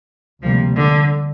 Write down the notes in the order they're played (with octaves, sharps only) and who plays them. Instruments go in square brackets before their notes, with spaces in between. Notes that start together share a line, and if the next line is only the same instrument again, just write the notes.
[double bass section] D2 C3 G3 A#3 [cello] F3
[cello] D3